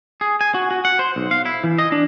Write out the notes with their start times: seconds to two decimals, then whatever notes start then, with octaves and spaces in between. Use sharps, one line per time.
0.21 G#4
0.41 G#5
0.54 F#4
0.71 F#4
0.85 F#5
0.99 C5
1.16 B1
1.31 F5
1.45 E4
1.64 E3
1.78 D#5
1.92 D4